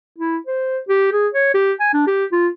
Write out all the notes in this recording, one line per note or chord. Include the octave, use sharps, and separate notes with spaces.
E4
C5
G4
G#4
C#5
G4
G#5
D4
G4
F4